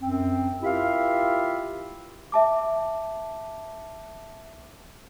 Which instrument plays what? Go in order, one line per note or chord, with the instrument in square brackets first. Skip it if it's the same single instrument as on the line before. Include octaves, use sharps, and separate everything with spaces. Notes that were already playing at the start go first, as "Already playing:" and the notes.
[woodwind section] F#2 C4
E4 F4 G4 A#4 E5 F5
[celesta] E5 A5 D6